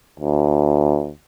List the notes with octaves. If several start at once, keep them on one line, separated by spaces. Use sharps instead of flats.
D2